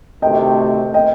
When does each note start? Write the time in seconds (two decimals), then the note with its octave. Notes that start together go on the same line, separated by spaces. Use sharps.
0.22 D2 C3 D#3 A3 D#5 G5
0.94 D#5 G5